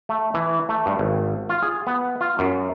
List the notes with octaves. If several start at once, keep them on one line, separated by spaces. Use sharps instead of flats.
A3
E3
A3
G2
G#1
F4
G#4
B3
F4
F#2